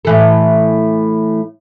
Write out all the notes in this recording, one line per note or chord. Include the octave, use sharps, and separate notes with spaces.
A2 E3 A4